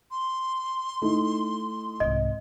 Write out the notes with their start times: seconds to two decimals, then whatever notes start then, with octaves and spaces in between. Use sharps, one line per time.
0.11 C6
1.02 A3 D#4 E4
2.00 C2 G#2 D#5